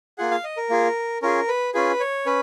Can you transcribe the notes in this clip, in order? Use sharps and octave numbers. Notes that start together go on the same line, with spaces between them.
A#3 F4 G#4 F#5
F5
D#5
A#4
A#3 F4 G#4
C#4 F4 G#4 A#4
B4
C#4 F4 G#4 B4
C#5
C#4 B4